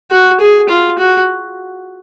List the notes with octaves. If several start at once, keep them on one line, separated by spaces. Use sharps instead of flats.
F#4
G#4
F4
F#4